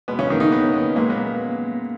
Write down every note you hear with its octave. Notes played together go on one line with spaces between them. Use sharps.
B2 G#3 B3
C#3 C#4
D#3 D#4
D#3 D#4
B3
B3
A#2 G#3 A#3
B3